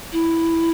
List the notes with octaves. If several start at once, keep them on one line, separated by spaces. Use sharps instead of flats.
E4